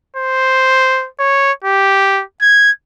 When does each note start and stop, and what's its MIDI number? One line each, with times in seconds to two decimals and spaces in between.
0.17 1.07 72
1.19 1.52 73
1.64 2.23 67
2.42 2.71 92